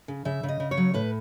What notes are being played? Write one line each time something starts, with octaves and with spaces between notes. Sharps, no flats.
C#3
C#3 E5
C#3
D#5
C#3
C#5
F#3
A2 B4